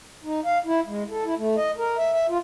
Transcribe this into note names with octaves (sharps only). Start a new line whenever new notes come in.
D#4
F5
E4
G#3
A4
E4
A3
D#5
A#4
E5
E5
F4